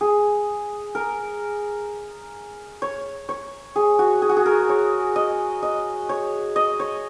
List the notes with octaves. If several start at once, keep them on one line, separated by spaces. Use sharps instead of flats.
G#4
A#4
C#5
C#5
G#4
F#4
G#4
F#4
G#4
A#4
C#5
D#5
D#5
C#5
D#5
C#5